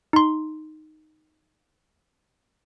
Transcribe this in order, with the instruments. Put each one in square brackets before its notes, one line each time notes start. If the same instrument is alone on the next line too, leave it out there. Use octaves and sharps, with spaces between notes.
[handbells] D#4 C6